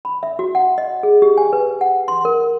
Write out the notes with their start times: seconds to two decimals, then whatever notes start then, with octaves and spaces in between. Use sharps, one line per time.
0.05 B5
0.23 E5
0.39 F#4
0.55 F#5
0.78 D#5
1.03 G#4
1.22 G4
1.38 G#5
1.53 B4
1.81 F#5
2.08 C6
2.25 A#4